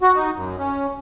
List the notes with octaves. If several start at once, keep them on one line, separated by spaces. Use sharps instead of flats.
F#4
D#4
F#2
C#4